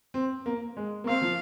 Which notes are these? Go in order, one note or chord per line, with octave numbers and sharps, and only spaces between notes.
C4
A#3
G#3
A#3
C4 F5
F3